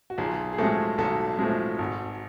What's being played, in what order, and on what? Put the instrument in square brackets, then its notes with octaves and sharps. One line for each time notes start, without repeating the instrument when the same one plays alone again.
[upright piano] F#4
[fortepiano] B1 [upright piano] F4 G#4
[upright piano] G#4
[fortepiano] A2 F3 G#3 [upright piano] F#4 A4
[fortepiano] B1 [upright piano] F#4 A4
[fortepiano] A2 F3 G#3
G#1